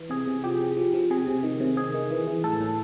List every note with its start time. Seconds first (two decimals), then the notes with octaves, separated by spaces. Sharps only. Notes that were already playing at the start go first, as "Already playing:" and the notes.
Already playing: E3
0.10 C3 G#4
0.27 C3
0.44 F3 G4
0.60 C3
0.77 F3
0.94 F3
1.10 C3 G#4
1.27 C3
1.43 D#3
1.60 C3
1.77 D#3 G#4
1.94 D#3
2.10 E3
2.27 E3
2.44 A2 A4
2.61 A2